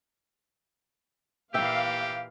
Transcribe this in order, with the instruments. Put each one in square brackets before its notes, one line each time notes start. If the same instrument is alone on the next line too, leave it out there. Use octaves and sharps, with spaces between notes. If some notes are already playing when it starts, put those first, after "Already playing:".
[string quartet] A#2 E3 E4 [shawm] G4 [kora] E5 G5 [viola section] F5